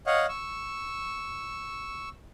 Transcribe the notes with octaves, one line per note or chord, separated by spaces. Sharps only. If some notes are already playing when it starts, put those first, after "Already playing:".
C#5 D#5 F5 F#5
C#6 E6